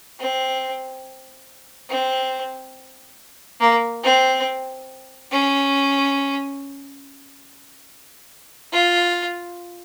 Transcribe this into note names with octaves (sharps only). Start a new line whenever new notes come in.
C4
C4
A#3
C4
C#4
F4